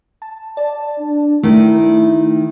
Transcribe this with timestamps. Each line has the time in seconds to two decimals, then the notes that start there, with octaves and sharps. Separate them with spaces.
0.22 A5
0.57 D5 A5
0.99 D4
1.43 D#3 A3 E4